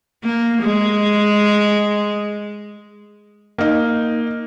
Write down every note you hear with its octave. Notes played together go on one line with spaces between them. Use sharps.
A#3
G#3
A#3 D#4